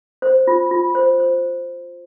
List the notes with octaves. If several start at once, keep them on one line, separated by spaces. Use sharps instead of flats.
C5
F4
F4
C5
C5